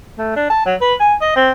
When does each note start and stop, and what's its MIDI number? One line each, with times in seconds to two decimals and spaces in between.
0.18 0.33 57
0.36 0.46 62
0.50 0.63 81
0.66 0.75 54
0.81 0.94 71
1.00 1.14 80
1.21 1.35 75
1.36 1.52 60